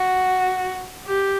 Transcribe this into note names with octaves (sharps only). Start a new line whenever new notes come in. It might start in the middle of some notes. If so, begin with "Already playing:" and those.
Already playing: F#4
G4